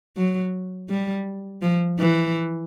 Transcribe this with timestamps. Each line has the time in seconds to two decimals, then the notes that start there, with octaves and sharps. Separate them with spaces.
0.17 F#3
0.89 G3
1.62 F3
1.99 E3